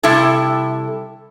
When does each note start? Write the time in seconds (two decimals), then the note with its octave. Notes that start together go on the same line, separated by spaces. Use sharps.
0.03 C3 G3 E4 A4